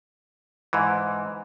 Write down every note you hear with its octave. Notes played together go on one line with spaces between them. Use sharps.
G#2 E3